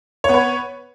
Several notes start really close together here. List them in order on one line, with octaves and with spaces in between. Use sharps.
C#5 B3 B4